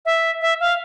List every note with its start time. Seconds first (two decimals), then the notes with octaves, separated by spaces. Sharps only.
0.06 E5
0.41 E5
0.60 F5